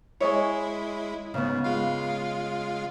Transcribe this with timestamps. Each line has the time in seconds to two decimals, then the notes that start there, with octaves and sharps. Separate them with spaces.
0.20 G#3 E4 C#5 D#5 G#5
1.34 G#2 C#3 B3
1.64 G#3 F4 F5